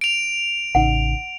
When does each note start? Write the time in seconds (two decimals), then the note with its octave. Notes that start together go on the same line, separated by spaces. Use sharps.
0.01 D7 F7
0.75 A1 C#3 D#4 F#5